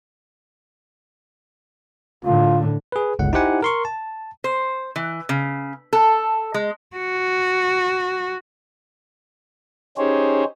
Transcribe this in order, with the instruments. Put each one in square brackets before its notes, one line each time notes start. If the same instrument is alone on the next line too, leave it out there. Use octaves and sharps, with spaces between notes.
[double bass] A2 D3 [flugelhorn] F4
[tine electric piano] G#4 B4
G1 C#2 F#5
D#4 E4 G4 C5 F#5 G#5
A#4 C6 C#6
A5
[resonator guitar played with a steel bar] C5
E3
C#3
A4
G#3
[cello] F#4
[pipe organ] C#4 D#4 G4 G#4 C5 C#5